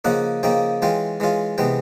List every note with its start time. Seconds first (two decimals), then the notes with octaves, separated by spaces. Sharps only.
0.05 C#3 F3 A#3 D#4 F#5
0.43 C#3 F3 A#3 D#4 G5
0.82 E3 G#3 C#4 F4 G5
1.20 E3 G#3 C#4 F4
1.58 C3 E3 G#3 B3 G5